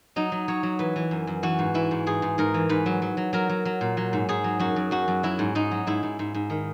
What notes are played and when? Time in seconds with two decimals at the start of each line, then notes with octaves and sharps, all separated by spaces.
0.16 F#3 D#4
0.32 F#3
0.48 F#3 C#5
0.63 F#3
0.79 E3 B4
0.96 E3
1.11 F#2
1.27 F#2
1.43 E3 F#4
1.59 G#2
1.74 E3 E4
1.91 G#2
2.06 G#2 G#4
2.22 G#2
2.38 G#2 A#4
2.54 E3
2.69 G#2 B4
2.86 F#3
3.02 F#3
3.17 F#3
3.33 F#3 A#4
3.49 F#3
3.65 F#3
3.81 A#2
3.97 F#3
4.13 G#2
4.29 G#2 G#4
4.44 F#3
4.59 F#2 F#4
4.76 F#2
4.91 F#2 F#4
5.08 F#2
5.23 F#3 E4
5.39 G#2
5.55 G#2 D#4
5.71 F#3
5.87 G#2 E4
6.03 G#2
6.19 G#2
6.34 G#2
6.50 D#3